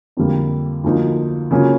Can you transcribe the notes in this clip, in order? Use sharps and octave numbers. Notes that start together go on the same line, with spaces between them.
F2 D3 G3 A#3
D2 D3 F3 A#3 D#4
C#3 F#3 A#3 C#4 F4